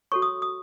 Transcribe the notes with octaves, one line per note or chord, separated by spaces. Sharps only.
F#4 A4 C#5 C#6
D#6
D#6